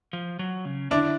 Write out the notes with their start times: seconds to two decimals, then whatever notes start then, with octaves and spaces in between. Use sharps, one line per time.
0.13 F3
0.39 F#3
0.65 C#3
0.91 D3 D4 E4